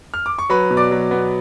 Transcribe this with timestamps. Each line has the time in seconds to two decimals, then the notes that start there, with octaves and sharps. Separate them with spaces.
0.14 F6
0.26 D6
0.39 C#6
0.50 F#3 B4 B5
0.71 B2
0.77 D5 D6
0.91 F#3
1.11 B3